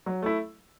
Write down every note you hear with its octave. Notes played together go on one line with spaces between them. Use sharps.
F#3
A3 E4